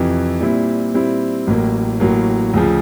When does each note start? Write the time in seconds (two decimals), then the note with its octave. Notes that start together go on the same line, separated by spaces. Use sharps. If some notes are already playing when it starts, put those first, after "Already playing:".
Already playing: F2 C3 E3
0.41 A#2 G3 C4 E4
0.94 A#2 G3 C4 E4
1.47 A1 A2 F#3 A#3
2.00 A1 A2 F#3 A#3
2.54 D2 C#3 F3